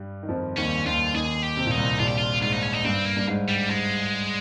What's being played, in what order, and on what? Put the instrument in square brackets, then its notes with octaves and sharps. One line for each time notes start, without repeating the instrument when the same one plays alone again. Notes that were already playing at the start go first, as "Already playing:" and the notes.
Already playing: [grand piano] G2 G3
D#3
F2 F3
[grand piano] D#2 D#3 [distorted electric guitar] C#4
[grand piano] D#2 D#3 [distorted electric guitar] F4
[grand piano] D#2 D#3 [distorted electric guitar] G#4
[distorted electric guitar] G4
[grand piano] C3
A#2
[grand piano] C2 C3 [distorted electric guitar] D#4
[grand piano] A#1 A#2 [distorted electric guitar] F4
[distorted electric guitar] G4
F4
[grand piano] G#2 [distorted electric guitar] F4
[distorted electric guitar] D#4
C#4
D#4
[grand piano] G2 [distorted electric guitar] C4
[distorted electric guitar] A#3
[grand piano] G2
G#2
[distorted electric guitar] G3
[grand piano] G#2 [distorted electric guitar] G#3